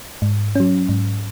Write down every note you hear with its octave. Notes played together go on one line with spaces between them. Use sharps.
G#2
F#3 C#4
G#2